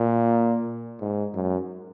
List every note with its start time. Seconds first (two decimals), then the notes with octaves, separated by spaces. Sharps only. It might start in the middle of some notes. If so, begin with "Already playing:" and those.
Already playing: A#2
1.01 G#2
1.34 F#2